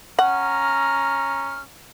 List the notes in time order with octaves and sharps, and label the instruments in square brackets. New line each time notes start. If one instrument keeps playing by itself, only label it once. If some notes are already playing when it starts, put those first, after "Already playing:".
[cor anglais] C#4 [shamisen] F#5 [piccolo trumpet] A#5 [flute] F6